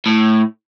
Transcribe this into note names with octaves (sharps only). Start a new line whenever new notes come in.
A2